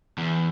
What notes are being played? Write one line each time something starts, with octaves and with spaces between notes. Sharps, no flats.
E2